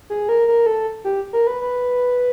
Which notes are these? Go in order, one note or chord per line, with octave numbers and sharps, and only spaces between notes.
G#4
A#4
A#4
A4
G4
A#4
B4
B4